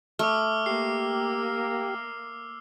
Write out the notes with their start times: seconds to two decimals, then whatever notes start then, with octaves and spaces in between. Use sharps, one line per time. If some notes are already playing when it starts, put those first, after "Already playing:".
0.19 A3 D6 E6 F6
0.66 A#3 G4 C7